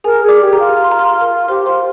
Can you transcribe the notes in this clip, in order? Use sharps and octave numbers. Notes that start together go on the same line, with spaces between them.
G#4 A#4 G#5
G#4
D5 D6
G4
A#4 A#5
F4
A#5
C6
A#5
C6
A#5
C6
A#4 A#5
G4 C5 C6
F4 C5 C6